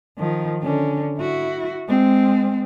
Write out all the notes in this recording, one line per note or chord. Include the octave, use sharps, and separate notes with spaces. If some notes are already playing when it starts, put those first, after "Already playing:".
D#3 F3
D3 C#4
E4 F#4
G#3 C4